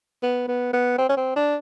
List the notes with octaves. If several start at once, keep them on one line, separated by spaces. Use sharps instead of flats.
B3
B3
B3
C4
C#4
C4
D4